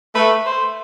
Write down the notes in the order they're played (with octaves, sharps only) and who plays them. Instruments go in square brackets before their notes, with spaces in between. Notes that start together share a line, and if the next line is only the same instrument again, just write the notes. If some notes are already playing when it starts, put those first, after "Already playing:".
[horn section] A3 [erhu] B4
[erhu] C5